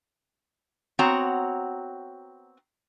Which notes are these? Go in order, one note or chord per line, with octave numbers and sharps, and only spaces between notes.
B3 C4 F#4 C#5 F#5 A#5